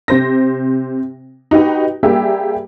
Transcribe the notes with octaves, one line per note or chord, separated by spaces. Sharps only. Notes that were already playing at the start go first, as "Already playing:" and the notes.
C3 C5 A#6
D#4 F#4 G4 B4
G3 A#3 G4 G#4 E5